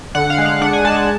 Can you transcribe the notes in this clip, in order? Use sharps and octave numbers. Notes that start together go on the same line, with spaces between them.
D3 F#5
F5
G#3
F5
D4 F#5
G#5
G#3 A5
A5